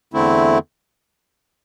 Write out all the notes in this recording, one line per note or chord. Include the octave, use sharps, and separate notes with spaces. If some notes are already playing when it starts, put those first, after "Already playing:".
E2 D3 A3 C4 E4